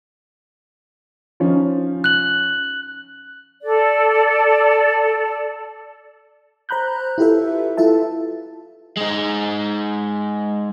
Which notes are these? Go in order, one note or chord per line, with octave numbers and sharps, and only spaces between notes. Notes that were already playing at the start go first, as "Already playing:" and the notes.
F3 C#4 D#4
F#6 F#7
A4 D5
C5 A#5 B5 F#6 G6
E4 F4 G4 A4 B4 E5
E4 F4 A4 E5 A5
G#3 D#4